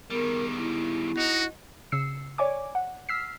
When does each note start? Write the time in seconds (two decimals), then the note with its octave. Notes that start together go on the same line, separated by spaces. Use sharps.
0.10 D#3 G3 B3 G#4 A#4
0.58 E4
1.17 D#4 F#4 D#5
1.92 C#3 E6 C7 C#7
2.38 C#5 D5 G#5 D6
2.75 F#5
3.09 E6 F6 B6 C7